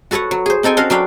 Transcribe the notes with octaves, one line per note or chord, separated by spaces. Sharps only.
F#4 A4 B4 C#5 F#5
F#3
G#4 C5
C4 D#4 A4 G5 G#5
C#4 F#4 A4 A#4 F5
F#3 D4 F5 G5 B5